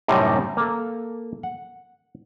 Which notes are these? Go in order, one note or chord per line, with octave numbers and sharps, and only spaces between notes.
F#2 A2 C3 G3 C4 D#4
A#3 A4
F#5